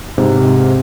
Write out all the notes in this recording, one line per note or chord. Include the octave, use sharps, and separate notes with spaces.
G#2 C3